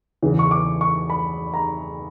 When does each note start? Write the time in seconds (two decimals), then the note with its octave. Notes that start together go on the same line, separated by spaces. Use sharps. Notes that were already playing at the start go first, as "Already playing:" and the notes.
0.23 E2 C#3 E3
0.39 C#6
0.51 D6
0.81 C#6
1.10 B5
1.54 A#5